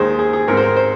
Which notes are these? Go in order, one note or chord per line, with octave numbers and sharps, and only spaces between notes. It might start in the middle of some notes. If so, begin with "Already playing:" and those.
Already playing: D#2 D#3 G#3 C5
G#4
G#4
G#2 G#3 C4 A#4
C5
A#4
C5